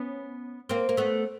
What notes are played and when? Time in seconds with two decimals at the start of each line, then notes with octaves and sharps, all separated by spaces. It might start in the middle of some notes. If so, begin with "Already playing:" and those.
Already playing: B3 C#4
0.69 A#3 C4
0.89 A#3
0.97 A3 B3